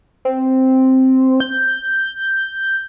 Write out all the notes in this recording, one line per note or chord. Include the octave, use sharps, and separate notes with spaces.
C4
G6